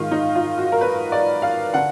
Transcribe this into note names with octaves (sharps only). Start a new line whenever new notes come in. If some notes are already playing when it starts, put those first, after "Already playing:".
Already playing: G#2 D#3 F4
D#4
F4
F#4
A#4
B4
D5
F5
D3 F#5